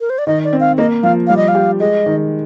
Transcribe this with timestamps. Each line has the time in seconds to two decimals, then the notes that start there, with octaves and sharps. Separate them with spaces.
0.01 A#4
0.10 C5
0.18 D5
0.27 D#3 D#5
0.44 D5
0.53 C4
0.60 F5
0.78 A#3 D#5
1.03 F3 F5
1.27 G3 F5
1.37 D#5
1.48 F5
1.55 G4
1.80 G#3 D#5
2.06 D#3